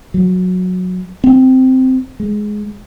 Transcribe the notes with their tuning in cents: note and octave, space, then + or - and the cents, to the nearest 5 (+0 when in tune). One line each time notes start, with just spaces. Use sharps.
F#3 -15
C4 -10
G#3 +10